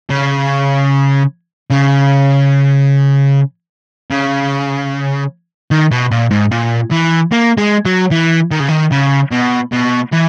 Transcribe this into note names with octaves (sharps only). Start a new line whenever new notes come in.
C#3
C#3
C#3
D#3
B2
A#2
G#2
A#2
E3
A#3
G#3
F#3
E3
D#3
C#3
D#3
C#3
B2
B2
E3